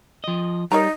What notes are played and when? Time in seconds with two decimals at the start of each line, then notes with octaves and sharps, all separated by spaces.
0.24 F3 D#5
0.72 G3 D#4 A#4 C#5 A#5